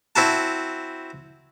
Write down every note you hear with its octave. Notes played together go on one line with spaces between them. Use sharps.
C4 E4 F#4 A5